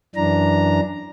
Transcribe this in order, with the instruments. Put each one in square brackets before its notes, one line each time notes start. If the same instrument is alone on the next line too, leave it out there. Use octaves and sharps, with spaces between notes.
[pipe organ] F#2 E3 D4 A#5